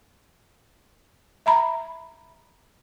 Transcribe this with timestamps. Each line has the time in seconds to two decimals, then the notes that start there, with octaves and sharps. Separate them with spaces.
1.46 E5 A#5 B5